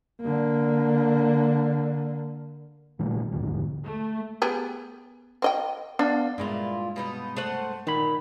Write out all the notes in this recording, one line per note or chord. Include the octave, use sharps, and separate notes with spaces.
D3 A#3
A#2 D#3 G3 A3
A#1 D#2 G#2 D3
A3
B3 G4 G#4
C4 D#5 G5
B3 D4 D5 F5
G2 A#2 G#3 E4 F4
B2 B3 D#4
A3 C5 F#5
A#2 D#3 B5